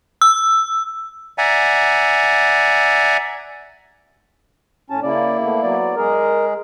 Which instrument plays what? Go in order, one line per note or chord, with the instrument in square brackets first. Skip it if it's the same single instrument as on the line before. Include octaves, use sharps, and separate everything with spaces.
[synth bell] E6
[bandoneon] D5 E5 F#5 G#5 A#5
[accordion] A2 C#4 A5
[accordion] C#3 D5 [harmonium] A#3 E4
[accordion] A3 B3
F#3 B3 D5
[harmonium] G#3 G#4 [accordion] A#4